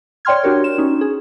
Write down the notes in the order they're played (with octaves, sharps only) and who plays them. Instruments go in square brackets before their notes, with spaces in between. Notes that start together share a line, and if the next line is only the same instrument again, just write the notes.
[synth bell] C#5 D5 G5 C6 F6 G#6
D4 F#4 G4 A#4 C#5
E7
C#4 D#4
G#4